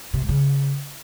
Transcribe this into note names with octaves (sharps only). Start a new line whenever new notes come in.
C3
G#2
C#3